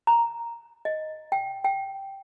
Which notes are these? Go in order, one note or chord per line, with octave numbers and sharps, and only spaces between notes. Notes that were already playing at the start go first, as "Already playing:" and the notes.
A#5
D#5
G5
G5